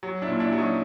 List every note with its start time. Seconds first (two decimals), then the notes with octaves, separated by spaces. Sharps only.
0.03 F#3
0.22 D4 E4
0.28 A#2
0.40 D4 E4
0.52 F#3
0.58 C#4 D#4